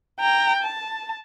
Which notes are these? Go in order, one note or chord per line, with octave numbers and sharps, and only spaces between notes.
G5 A#5
A5